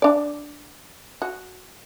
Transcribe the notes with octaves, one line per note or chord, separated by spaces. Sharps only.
D4 D5
F#4